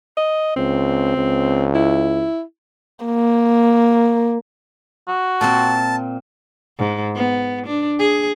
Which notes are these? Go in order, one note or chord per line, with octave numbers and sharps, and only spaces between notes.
D#5
C#2 C4
C#2
E4
A#3
F#4
A#2 A#3 C4 A5
G#2
B3
D4
G#4